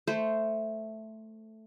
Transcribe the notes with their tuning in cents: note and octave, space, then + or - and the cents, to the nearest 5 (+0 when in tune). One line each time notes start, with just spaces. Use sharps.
A3 +0 C5 -10